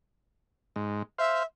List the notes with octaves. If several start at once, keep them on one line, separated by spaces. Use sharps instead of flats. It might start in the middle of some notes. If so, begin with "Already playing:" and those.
G#2
C5 E5 F5